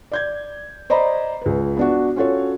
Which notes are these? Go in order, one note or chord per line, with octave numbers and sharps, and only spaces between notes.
D5 G6 G#6
C5 D5 D#5 A#5 B5
C#2 B4
B3 D4 F#4
C#4 F4 F#4 A4 C#5